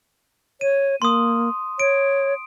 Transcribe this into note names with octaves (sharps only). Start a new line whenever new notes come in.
C#5 D#7
A#3 C6 D#6
C#5 D7